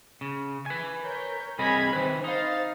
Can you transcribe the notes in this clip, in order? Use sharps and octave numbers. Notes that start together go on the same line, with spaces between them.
C#3
B4 G#5
A#4 C#5 G6
C2 C4 G#4 D#5 B5 G#6
D#3 C4 B4
D#4 C5 F5 A6